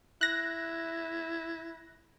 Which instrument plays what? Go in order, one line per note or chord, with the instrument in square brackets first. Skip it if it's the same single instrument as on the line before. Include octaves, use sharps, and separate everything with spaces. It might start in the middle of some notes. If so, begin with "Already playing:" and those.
[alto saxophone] E4 [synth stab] F#6 A#6